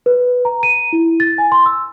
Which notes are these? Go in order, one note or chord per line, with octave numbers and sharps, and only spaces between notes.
B4
A#5
D#7
E4
A6
G#5
C6
E6